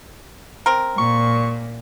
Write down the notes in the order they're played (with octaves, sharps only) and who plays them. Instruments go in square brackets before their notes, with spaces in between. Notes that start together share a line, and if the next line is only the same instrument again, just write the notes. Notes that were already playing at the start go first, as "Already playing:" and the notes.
[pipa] C4 A#4
[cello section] A#2 [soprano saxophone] C#6